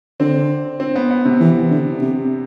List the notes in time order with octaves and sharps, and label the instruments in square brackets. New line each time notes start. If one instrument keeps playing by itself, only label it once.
[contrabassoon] D3 [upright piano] C4
[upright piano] C4
B3
B3
C3
[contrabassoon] E3
D3
C3